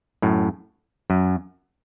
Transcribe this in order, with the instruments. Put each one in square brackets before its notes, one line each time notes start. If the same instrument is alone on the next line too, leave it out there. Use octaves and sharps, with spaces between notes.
[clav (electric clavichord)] F#2 A2
F#2